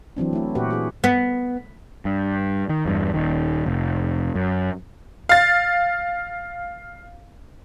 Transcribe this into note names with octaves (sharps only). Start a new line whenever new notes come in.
E3 F#3 C4 D4
A3 E4
A#2 F#4 G4 B4
F#4 G#4
B3
G2
D#3
E2 G2
D#1 D#3
F1
F#2
F5 A6